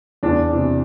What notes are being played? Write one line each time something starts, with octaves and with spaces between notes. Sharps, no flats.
E2 D4
C3 E3